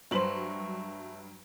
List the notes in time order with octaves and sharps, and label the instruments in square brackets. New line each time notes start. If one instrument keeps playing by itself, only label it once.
[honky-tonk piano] G2 F#3 F#7 [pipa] A3 B4 C5